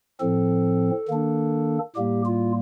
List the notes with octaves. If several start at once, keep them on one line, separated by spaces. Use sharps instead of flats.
A2 F3 C4 A4
D#3 A#3 D4
A2 G3 A#3 G4
F4